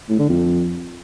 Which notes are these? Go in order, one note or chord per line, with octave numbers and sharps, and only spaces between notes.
A2
D3
F2